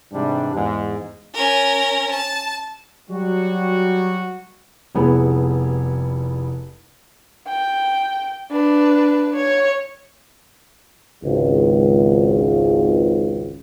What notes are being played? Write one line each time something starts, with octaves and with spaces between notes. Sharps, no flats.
G#2 C3 E3 G3 D4
E2 G#2
C#4 A#4
A5
F#3 G3 F#4
F1 G3 B3 E4 G#4
G5
D4 B4
C#5
G#1 C#2